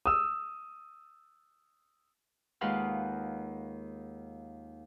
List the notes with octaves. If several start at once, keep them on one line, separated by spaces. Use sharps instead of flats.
D#6 E6
D#2 G#3 F4 B4 F#5 F6